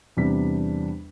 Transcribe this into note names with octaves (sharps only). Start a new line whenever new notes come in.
E2 C3 G3 D4 B6